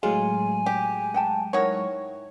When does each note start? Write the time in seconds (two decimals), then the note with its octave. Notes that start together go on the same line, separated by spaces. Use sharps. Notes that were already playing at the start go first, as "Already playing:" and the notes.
0.03 A2 F#3 G#3 F4 G#5
0.66 G4
1.14 F#5 G5 A5
1.53 D#4 E4 F#4 A#4 C#5